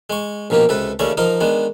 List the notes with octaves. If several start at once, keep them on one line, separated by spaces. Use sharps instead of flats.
G#3 C#6
A#1 B2 D#3 A#3 G4
C#2 C3 A4 B4
D#2 C#3 A3 C#4 D5 C#6
F3 D#4 A#4 D#5
D#3 G#3 B3 D4